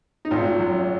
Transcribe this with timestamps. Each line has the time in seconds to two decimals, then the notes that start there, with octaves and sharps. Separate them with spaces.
0.25 D#4
0.31 G#1 F4
0.59 F#2